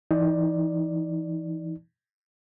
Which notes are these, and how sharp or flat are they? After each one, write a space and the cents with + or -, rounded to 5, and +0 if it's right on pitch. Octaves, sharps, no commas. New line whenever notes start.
E3 +25 D#4 +25 D5 +0